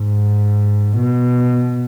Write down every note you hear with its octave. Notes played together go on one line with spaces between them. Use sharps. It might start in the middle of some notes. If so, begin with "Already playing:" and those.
Already playing: G#2
B2